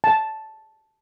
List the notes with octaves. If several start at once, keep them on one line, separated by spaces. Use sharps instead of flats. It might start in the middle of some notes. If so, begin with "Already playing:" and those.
A5